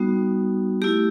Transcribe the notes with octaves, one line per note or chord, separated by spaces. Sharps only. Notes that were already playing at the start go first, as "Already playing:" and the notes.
Already playing: G3 B3 D#4 F#4
A3 E4 G4